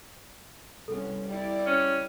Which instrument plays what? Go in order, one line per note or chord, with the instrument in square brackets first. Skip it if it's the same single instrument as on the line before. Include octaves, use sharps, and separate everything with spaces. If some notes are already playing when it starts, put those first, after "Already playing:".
[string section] C2 [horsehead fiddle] B3 C#4 [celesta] A4
[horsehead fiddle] G3 E4 [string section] D5
[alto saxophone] C#4